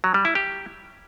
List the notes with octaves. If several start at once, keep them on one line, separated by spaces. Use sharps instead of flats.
F#3
G3
E4
G4